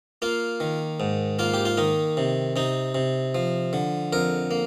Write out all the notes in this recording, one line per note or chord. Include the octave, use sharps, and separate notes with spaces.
A#3 F4
D#3
G#2
A#3 F4
G4
F4
D#3 D#4
C3
C3 D#4
C3
F3
D3
F2 A#4
A#3